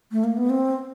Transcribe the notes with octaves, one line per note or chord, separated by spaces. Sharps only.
A3
A#3
B3
C4